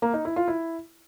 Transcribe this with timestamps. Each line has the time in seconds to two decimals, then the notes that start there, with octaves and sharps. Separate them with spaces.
0.02 A#3
0.14 D#4
0.25 E4
0.36 F4
0.48 E4